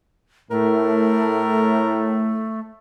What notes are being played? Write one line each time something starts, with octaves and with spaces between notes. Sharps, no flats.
A2 A3 A#4